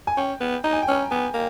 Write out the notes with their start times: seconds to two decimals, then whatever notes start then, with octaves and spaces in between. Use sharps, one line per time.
0.07 G#5
0.17 C#4 G5
0.41 B3
0.64 D#4 A#5
0.73 G#5
0.82 G5
0.88 C#4 G#5
1.11 B3 G#5
1.34 A#3